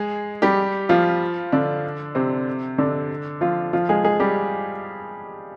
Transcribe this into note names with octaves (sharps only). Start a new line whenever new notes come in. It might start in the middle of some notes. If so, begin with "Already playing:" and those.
Already playing: G#3 G#4
G3 G4
F3 F4
D3 D4
C3 C4
D3 D4
F3 F4
F3 F4
G#3 G#4
G#3 G#4
G3 G4